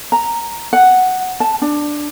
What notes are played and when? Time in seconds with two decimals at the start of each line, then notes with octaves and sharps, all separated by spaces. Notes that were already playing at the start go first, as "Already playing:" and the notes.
0.12 A#5
0.73 F#5
1.40 A5
1.62 D4